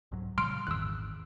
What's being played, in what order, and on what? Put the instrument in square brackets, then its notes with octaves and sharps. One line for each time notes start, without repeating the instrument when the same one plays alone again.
[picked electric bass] C2 G#2 F#3
[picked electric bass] A#2 C#3 F3 [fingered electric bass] G3 [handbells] C6 F6 D7
[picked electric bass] G#1 E2 [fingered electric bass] G#2 D#3 [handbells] E6 F#6